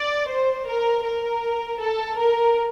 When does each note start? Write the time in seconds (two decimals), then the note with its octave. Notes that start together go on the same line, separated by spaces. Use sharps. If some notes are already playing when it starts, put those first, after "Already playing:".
Already playing: D5
0.29 C5
0.68 A#4
1.05 A#4
1.81 A4
2.19 A#4